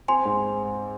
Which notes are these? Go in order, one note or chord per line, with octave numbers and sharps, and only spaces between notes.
C4 G#5 C6
G#2